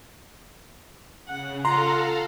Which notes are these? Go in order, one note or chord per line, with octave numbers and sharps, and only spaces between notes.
C#3 F#5
F4 A4 F5 F#5 A#5 C6